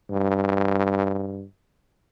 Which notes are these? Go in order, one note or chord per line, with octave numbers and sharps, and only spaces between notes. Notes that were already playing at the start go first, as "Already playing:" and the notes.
G2